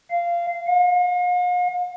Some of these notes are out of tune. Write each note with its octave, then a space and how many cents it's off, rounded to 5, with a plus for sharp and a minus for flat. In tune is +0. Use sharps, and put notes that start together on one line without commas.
F5 -15
F5 +45